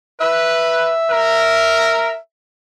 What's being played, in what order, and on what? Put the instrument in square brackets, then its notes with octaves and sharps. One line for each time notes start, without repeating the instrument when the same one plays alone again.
[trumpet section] B4 [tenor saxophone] E5
[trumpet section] A#4